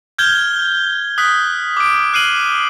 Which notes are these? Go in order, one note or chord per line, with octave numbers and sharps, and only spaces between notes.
F6 G6 G#6 G7
D#6 F#6 B6
D6 D7
F6 F#6 C7 D#7 F#7